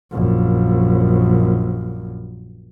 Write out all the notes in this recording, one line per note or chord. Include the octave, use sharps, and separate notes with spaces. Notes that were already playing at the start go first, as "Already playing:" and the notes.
A#1 F#2